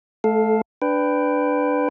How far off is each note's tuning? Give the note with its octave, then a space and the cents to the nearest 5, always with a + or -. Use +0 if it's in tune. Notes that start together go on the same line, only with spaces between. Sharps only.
A3 -30 A4 +0 F5 +10
D4 +0 B4 +15 G5 +0